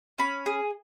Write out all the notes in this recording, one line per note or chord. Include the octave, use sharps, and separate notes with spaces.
C#4 B5
G#4